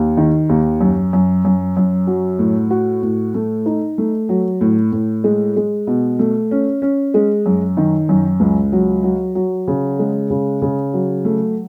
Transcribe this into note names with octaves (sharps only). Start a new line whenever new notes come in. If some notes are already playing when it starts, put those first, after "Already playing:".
Already playing: D#2
D#3
D#2
F#2
F#2
F#2
F#2
F#3
A2
F#4
A2
A3
D#4
A3
F#3
A2
A2
G#3
G#3
B2
A3
C#4
C#4
G#3
F#2
D#3
F#2
C#2
F#3
F#3
F#3
C#3
G#3
C#3
C#3
F#3
A3